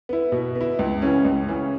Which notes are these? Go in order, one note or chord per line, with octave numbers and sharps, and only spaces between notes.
B3 E4
B2
B3
E4
C#2
C#3 E3 C#4
C#2
C#3 E3 C#4